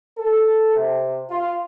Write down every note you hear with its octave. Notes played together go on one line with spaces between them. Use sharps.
A4
C3
F4